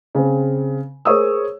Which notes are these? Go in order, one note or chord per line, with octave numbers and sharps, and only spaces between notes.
C#3 C4
G#4 A#4 C5 C#5 D#6 E6